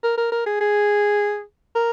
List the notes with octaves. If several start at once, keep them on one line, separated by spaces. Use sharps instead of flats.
A#4
A#4
A#4
G#4
G#4
A#4